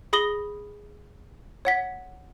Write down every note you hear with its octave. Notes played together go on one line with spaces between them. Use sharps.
G#4 B5 D#6 A#6 G7
C#5 F#5 B6